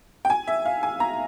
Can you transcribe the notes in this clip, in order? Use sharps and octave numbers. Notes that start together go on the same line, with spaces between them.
G5
G#5
E5
F5
G#5
A#5